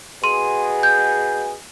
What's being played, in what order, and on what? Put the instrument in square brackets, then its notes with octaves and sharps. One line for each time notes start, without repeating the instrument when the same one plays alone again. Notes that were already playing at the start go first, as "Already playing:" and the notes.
[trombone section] B2 G#4 [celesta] C6 D#7
[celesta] G6